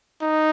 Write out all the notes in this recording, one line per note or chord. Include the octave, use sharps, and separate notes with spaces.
D#4